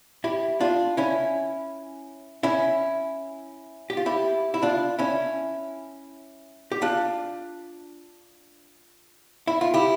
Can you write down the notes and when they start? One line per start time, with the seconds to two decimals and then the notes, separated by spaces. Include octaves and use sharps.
0.24 E4 G4
0.60 D4 F4
0.97 C#4 E4
2.43 C#4 E4
3.90 G4
3.97 F4
4.06 E4 G4
4.54 E4
4.62 D4 F4
4.99 C#4 E4
6.72 G4
6.82 D4 F4
9.47 E4
9.61 F4
9.74 E4 G4